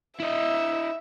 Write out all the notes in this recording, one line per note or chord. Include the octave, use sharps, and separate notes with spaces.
E4 D#5 E5